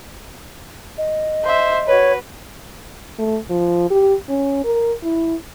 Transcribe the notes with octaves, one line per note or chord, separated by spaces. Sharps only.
D#5
C5 E5
F#4 B4 C#5
A3
F3
G4
C#4
A#4
E4